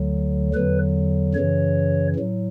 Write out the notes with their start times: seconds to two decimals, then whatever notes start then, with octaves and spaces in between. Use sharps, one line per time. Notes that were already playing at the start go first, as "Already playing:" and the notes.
Already playing: D2 D3 F#3
0.54 E2 D3 F#3 B4
1.35 F#2 C#3 E3 C#5
2.15 A2 F#3